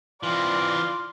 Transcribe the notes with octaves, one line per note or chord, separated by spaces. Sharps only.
E3 C4 F4 D5